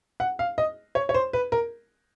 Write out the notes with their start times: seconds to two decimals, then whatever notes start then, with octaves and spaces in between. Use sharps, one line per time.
0.20 F#5
0.39 F5
0.58 D#5
0.95 C#5
1.09 C#5
1.14 C5
1.33 B4
1.52 A#4